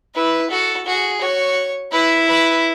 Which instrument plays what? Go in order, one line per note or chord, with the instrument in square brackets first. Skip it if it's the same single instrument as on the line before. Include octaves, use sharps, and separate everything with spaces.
[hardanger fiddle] E4 [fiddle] B4
[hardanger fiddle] F#4 [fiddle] A4
[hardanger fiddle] F#4 [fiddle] G#4
[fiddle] F#4 [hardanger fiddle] C#5
[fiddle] E4 [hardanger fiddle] B4
[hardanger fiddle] B4